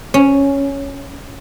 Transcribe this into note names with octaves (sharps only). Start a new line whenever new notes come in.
C#4